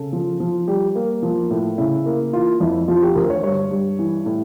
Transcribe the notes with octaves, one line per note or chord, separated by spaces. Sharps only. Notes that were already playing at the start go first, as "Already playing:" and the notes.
Already playing: C#3 A4
F3
F3
G3 G4
A#3
F3
A2
C#3 E4
A#3
E3 F4
F2 E4
F3 F4
G4
D2 A#4
C#5
G2 C#5
G2
E3
A2